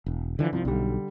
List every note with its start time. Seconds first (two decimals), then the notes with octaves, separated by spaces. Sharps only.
0.06 E1
0.39 D3 E3 F3
0.53 C2 F3
0.65 B1 D3 G3